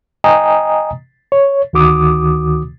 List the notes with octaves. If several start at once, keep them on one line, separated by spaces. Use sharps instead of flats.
D#5 G5 G#5 A#5 D#6
C#5
D2 D#3 F#4 D6 D#6